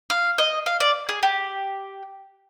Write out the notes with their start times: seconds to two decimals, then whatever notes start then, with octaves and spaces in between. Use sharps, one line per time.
0.10 F5
0.38 D#5
0.66 F5
0.80 D5
1.09 G#4
1.23 G4